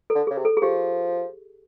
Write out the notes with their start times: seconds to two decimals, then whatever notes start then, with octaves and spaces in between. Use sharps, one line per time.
0.10 A4
0.15 D3
0.27 C#3 G#4
0.38 C3
0.45 A4
0.57 G#4
0.62 F3 G4